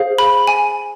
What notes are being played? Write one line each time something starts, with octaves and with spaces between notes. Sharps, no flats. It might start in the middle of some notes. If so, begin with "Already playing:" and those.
Already playing: G#4 C5 F5
B5
G#5